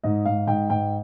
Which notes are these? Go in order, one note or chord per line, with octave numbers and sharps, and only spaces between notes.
G#2 D#5
G#2 F5
G#2 G5
G#2 G5